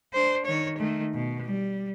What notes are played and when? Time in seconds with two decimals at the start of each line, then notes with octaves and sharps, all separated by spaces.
0.13 D4 C5
0.45 D#3 C#5
0.78 D#3 A3
1.14 B2
1.46 G3